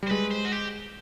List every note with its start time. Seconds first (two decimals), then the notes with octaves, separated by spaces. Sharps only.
0.03 G3
0.07 C5
0.11 G#3 B4
0.31 C5
0.45 F#4
0.52 G4